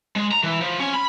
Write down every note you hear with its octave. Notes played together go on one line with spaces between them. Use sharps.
G#3
A#5
E3
F3
C#4
B5